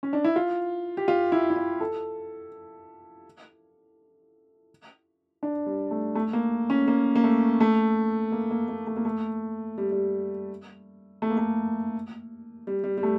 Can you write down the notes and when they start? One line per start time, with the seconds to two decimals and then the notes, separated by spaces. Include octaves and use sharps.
0.03 C#4
0.13 D4
0.24 E4
0.36 F4
0.97 G4
1.08 F4
1.32 E4
1.50 E4
1.56 F4
1.81 A4
5.43 D4
5.66 G3
5.91 A3
6.15 A3
6.33 A#3
6.70 C#4
6.88 A#3
7.15 A#3
7.24 A3
7.60 A3
8.32 A#3
8.51 A#3
8.68 A#3
8.87 A3
8.96 A#3
9.05 A3
9.78 G3
9.92 G3
11.22 A3
11.30 A#3
11.38 A3
12.67 G3
12.84 G3
12.98 G3
13.03 A3